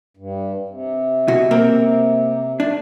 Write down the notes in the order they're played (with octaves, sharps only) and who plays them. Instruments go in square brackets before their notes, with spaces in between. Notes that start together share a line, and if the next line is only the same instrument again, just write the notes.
[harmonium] G2
C3
[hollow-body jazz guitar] B2 F#4
A#3 C4 A#4
[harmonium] A3 [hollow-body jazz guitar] D4